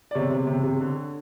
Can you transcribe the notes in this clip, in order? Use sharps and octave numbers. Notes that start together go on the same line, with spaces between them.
D5
C3 C#5
C3
C3
C3
D3